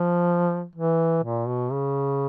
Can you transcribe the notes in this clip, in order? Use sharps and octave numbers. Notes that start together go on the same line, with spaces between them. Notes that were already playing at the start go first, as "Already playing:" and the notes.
Already playing: F3
E3
A#2
B2
C#3